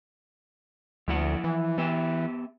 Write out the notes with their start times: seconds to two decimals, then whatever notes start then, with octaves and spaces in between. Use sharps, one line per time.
1.08 D2 F3 E4 F#5
1.44 E3
1.78 E3 B3 G4 E5